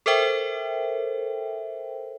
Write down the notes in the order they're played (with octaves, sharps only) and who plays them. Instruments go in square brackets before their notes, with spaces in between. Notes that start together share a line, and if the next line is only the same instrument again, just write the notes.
[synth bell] A4 A#4 C5 E5 G5